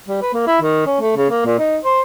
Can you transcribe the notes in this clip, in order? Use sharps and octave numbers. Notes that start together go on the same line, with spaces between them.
G3
B4
A#3
E4
D#3
C#4
A3
C#3
A#3
A#2
D#4
C5